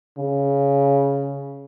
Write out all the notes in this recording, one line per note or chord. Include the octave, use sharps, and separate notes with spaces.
C#3